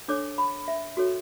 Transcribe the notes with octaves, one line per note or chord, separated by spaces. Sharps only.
D4 A4 C#5 D6
B5
E5
F#4 A4 C#5